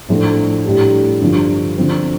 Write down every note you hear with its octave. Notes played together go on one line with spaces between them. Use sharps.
A2 F3 D4 F4 A4
A2 G3 D4 G4
G2 D3 F3
D3 F3 C4